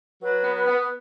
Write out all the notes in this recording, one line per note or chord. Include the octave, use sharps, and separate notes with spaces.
F#3 B4
B3
B4
B3
B4